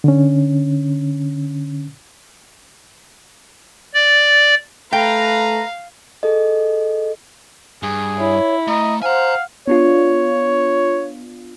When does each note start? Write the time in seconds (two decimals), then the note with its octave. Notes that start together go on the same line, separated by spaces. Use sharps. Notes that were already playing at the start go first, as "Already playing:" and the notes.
0.04 D3 C#4
3.94 D5
4.93 A3 B4 F5 G5 A#5
6.23 G#4 A4 D#5
7.83 G2 G#4
8.18 E4 C#5
8.68 A3 D#5 A#5
9.03 C5 F5 F#5 G#5 A#5
9.68 B3 D4 F4 C#5